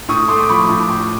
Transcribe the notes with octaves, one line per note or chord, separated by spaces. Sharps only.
A2 C#6 D#6
A3 C6 D6
D6
F3 B5 C#6
A2
A2